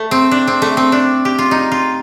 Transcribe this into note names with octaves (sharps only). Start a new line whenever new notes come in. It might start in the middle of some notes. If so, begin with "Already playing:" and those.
Already playing: A3
C4
D4
C4
A3
C4
D4
G4
F4
D#4
F4